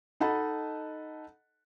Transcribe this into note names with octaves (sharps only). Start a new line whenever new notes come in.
D#4 A4 D#5 F#5 A5 B5